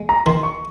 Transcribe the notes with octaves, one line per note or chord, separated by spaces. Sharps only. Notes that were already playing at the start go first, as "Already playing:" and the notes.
Already playing: G#3
A#5
D#3 C6
C#6